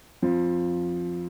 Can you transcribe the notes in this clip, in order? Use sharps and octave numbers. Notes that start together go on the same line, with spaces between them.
F2 F3